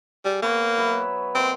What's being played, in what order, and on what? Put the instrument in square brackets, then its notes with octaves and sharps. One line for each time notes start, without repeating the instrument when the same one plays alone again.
[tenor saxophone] G3 [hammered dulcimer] G#4
[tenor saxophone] A#3 [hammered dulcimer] B3 B4 C#5
[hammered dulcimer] F#3 E5 B5
[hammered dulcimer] A#3 D#5 C6 [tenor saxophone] C4